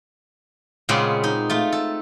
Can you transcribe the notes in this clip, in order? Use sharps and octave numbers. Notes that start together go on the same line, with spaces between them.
A#2 C#3 G#3 B3 C4
D#4
A3 F4
A4